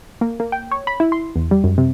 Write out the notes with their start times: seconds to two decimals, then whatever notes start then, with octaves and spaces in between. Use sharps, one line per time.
0.21 A#3
0.40 A#3
0.52 G5
0.71 C#5
0.87 B5
1.00 E4
1.12 C6
1.36 E2
1.51 G3
1.64 F#2
1.78 C3